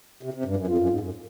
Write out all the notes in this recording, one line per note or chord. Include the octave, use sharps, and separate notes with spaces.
C3
C3
G2
F#2
F2 F4
F#2
G#2
F#2